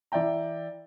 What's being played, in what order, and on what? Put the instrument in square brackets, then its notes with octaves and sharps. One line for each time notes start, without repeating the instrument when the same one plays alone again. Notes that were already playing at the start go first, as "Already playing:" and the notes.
[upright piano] E3 D5 E5 G5 A#5